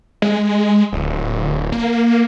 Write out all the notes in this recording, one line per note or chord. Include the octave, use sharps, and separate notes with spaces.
G#3
D1
A#3